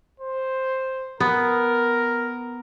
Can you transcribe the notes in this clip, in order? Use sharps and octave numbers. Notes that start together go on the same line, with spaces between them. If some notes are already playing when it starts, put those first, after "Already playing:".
C5
B3 A#4